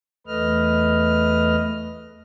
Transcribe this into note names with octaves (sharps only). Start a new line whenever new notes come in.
E2 A3 B4 D#5 F6